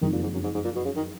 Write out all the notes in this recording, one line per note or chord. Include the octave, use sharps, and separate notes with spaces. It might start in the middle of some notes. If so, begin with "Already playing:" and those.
F#1 F2 D#3 F3 G#3 D#4
A#2
G#2
F#2
G#2
G#2
A#2
B2
C#3
D#3